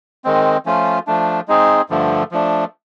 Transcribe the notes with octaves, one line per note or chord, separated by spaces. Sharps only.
D#3 G#3 C4
F3 A3 C#4 F4
F3 A3 D4
G#3 C4 D#4 G#4
G2 D3 F3 A3
F3 A3 D4